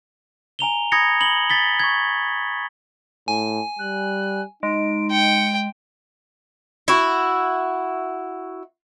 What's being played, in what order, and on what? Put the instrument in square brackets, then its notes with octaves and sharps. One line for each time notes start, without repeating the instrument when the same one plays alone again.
[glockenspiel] G#5 A#5 F7 G7
B5 D#6 G#6 A#6 C#7
B5 F#7 G7
A6 B6 G7
C#6 G#6
[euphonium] A2 [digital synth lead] G#5
[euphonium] G3 [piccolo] F#6
[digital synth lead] G#3 [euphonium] D#4 [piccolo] D7
[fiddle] G5 [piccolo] C#7
[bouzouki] E4 F#4